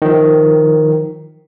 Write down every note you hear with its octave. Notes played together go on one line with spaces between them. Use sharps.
D#3 F3